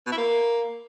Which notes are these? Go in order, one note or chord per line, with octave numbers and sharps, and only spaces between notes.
B2
E4
A#3